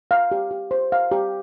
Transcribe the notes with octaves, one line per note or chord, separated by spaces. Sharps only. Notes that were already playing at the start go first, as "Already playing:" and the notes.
F5
G4
G4
C5
F5
G4